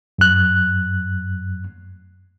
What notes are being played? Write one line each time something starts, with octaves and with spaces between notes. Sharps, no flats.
F#2 F#6